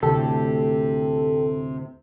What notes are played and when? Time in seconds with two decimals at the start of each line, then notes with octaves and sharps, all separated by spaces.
0.03 D2 A2 C3 G4 A4